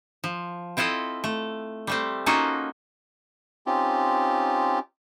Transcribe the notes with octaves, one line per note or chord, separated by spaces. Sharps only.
F3
C4 E4 F4 A4 D#5
A3
G3 A3 C4
A#3 C#4 D#4 F4 F#4 A4
C4 C#4 D#4 F4 G4